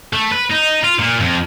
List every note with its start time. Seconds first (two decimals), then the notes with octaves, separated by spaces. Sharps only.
0.13 A3
0.31 B4
0.50 D#4
0.83 F4
0.99 A#2
1.20 F2